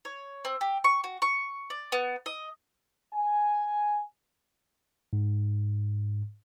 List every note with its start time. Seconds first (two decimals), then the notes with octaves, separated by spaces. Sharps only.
0.05 C#5
0.45 C4
0.61 G4
0.84 C#6
1.04 F#4
1.22 C#6
1.70 D5
1.92 B3
2.26 D#5
3.14 G#5
5.13 G#2